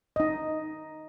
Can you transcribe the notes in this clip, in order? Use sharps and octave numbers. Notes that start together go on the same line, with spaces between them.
D#4 D#5